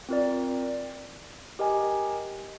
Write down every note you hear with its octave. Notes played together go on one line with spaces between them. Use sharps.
C4 F4 A#4 D5
G4 A#4 D#5 G#5